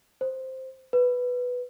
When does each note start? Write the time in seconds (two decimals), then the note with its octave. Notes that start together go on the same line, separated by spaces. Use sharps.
0.21 C5
0.93 B4